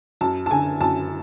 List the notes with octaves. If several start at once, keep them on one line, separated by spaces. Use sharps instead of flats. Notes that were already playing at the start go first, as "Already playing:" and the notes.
F#2 A5
A5
D3 G#5
F#2 A5